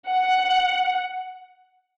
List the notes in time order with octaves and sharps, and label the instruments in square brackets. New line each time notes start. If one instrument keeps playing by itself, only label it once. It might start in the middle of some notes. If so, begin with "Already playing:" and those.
[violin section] F#5